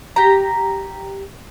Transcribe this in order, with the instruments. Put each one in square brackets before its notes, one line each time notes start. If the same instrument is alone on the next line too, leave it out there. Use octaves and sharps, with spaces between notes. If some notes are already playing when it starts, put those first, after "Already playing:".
[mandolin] G4 A#5